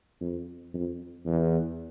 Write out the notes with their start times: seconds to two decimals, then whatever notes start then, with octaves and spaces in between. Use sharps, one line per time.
0.21 F2
0.74 F2
1.26 E2